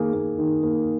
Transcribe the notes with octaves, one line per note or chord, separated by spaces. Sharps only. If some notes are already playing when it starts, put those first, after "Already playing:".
Already playing: D#3 A#3 G#4
A#3
D#3
A#3